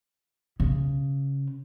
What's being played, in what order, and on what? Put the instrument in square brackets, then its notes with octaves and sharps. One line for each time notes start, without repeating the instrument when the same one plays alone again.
[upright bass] C#3